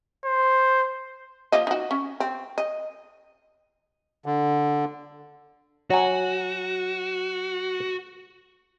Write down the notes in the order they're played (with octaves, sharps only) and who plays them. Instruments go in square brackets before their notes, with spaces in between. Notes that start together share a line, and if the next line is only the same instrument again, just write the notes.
[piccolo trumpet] C5
[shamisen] F3 A#3 D#5
D#4 F#4
C#4
C4
D#5
[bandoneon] D3
[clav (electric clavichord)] F#3 G#5 [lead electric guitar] F#4